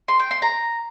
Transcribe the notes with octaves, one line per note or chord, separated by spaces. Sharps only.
C6
G5
C6
A#5